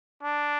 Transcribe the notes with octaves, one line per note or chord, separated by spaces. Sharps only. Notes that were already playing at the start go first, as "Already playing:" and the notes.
D4